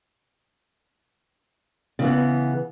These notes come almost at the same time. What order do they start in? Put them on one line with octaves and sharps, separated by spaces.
C#3 E3 B3